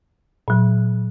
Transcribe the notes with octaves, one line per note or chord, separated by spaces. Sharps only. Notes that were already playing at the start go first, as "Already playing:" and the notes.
A#2 F#3